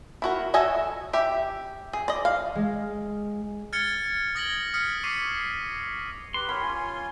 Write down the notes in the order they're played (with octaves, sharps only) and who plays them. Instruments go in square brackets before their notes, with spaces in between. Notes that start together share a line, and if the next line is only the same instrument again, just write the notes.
[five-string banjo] E4 F#4 A#4
F#4 A4 D#5 E5 G#5
G4 E5
G#4
D5 D#5
F5
[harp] G#3
[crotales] F6 G#6 A6 C#7 G7
D#6 G#6 A#6 D7 F#7 G7
D#6 F6 B6 C#7
C#6 D6 F6 B6 C7 D#7
[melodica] G4 B4 [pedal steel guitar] C6
[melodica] G4 A#4 C#5 [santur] B5
[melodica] C#4 F4 G#5